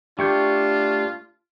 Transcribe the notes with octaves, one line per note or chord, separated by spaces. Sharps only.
A3 D4 F4 G4 C#6 G6